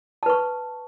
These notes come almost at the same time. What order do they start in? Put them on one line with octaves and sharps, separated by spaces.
A5 B4 C#6